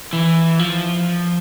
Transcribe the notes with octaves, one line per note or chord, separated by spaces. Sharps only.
E3
F3